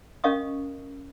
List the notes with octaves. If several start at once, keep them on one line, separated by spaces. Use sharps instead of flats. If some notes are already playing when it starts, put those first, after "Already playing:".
C#4 A#4 D#5 F5 C#6 D#6